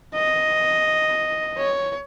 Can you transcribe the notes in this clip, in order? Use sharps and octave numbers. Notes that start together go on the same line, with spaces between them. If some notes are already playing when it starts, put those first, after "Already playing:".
D#5
C#5